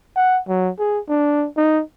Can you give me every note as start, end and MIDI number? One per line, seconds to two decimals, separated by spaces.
0.16 0.40 78
0.48 0.70 54
0.79 0.99 68
1.09 1.47 62
1.57 1.82 63